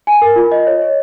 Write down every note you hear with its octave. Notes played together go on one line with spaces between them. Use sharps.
G#5
A#4
F4
D#5
C#5
C#5